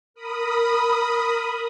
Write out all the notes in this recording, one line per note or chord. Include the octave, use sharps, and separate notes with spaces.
A#4 B5 D#6